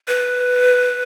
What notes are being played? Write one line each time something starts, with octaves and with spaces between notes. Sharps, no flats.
B4